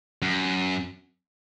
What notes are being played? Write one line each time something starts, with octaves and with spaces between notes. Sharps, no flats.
F#2